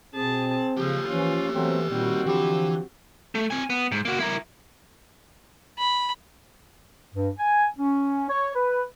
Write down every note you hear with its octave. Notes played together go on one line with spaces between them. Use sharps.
B2 C4 G#4 A5
C#3 F3 G4 C#5
E3 F3 C#4 F4
E3 F#3 A3 B3 C4
A#2 D#3 G3 C4 F#4
D3 E3 F3 G4 B5
A3
C4 G#5
B3
G#2
A#3 F#4
E4 A#4
B5
G2
G#5
C#4
C#5
B4